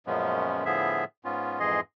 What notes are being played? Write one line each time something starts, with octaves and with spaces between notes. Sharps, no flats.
F#2 A#2 F3 G#3 B3 C#4
A2 D3 F3 B3 G#4 E5
G#2 B3 C#4 F4
F2 G#2 E3 G#4 D#5 C6